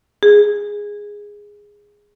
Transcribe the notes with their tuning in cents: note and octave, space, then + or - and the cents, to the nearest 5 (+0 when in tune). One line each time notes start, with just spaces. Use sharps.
G#4 -10